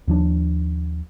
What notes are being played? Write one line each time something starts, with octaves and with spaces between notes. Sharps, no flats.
D#2 F3 D4